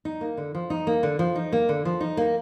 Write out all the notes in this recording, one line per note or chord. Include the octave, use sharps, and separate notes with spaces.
D#4
A#3
D3
F3
D#4
A#3
D3
F3
D#4
A#3
D3
F3
D#4
A#3